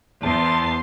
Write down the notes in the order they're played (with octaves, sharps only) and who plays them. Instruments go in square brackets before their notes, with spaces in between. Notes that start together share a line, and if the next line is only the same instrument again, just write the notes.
[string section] E2 [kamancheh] C5 C6 [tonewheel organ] A5